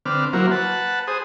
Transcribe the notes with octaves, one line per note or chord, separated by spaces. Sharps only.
D3 C4 B4 D6 F6
F#3 A#3 E4 F#4 A#4 C5
B4 F#5 A5
G#4 C5 D#6